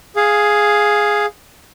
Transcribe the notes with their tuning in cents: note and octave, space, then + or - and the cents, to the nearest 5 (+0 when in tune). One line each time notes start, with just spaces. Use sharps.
G#4 +0 F5 +0